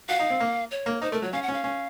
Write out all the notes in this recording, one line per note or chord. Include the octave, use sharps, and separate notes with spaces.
F#4 F5
D#4
C4
A#3
C#5
A#3
D#4 C5
A3 A#4
F#3 C#5
C#4 F5
F#5
C#4
F5
C#4